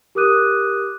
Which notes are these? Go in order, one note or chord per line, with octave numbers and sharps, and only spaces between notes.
G4 A#4 D6 D#6 F#6 D#7